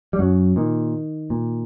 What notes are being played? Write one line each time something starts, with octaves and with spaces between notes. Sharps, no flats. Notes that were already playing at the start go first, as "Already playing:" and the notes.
G3
F#2 F#3
A#2 D#3
A#2